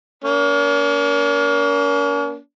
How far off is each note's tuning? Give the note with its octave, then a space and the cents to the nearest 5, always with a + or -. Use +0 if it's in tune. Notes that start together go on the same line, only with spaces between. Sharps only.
A#3 +20 C#4 +45